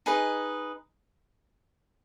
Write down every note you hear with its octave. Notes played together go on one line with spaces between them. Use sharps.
D#4 G#4 B4 D#5